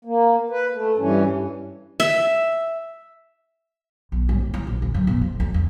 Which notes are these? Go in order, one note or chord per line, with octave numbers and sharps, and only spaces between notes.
A#3
B4
A3
G2 E3 C#4
E5
B1
G2
C#4
E4
A#1
D2
F#2
B2
F2
D2
E2